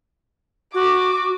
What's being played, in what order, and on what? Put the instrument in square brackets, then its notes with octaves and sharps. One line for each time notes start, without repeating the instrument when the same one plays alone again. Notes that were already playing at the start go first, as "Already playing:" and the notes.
[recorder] F#4 [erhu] D6